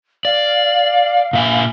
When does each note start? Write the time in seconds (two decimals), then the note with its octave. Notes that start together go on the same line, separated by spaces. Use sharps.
0.25 D5 F5
1.33 A#2 E5 G#5